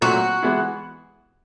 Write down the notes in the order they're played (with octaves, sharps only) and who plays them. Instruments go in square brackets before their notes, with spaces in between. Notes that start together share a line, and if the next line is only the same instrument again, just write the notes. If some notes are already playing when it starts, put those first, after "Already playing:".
[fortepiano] A#2 F#3 A3 C4 [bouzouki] F#4
[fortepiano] E3 G#3 B3 E4